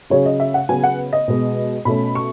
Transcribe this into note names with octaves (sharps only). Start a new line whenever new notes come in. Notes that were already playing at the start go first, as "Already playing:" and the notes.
C#3 F#3 C#4 C#5
D#5
E5
F#5
C#3 F#3 B3 G#5
F#5
D#5
B2 G#3 B3
B2 A3 C#4 B5
C#6